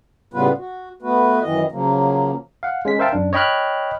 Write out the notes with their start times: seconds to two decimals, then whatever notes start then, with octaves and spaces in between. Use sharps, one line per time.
0.34 A2 C#3 G3 B3 F4 B4
0.58 F#4
1.02 A3 B3 F#4 B4
1.41 F#2 D#3 E3 D#5
1.72 C#3 F3 F#3 A#3
2.63 F5 F#5
2.85 G#3 C#4 B6
2.99 A#4 C5 E5 F5 G5 A5
3.13 F#2 D4
3.33 C#5 D#5 G5 B5 F6 F#6